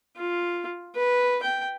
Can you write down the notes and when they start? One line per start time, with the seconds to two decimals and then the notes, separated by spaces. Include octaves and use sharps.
0.17 F4
0.96 B4
1.43 G5